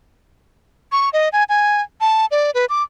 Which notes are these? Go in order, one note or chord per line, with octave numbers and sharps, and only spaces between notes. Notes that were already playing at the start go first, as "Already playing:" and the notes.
C#6
D#5
G#5
G#5
A5
D5
B4
D6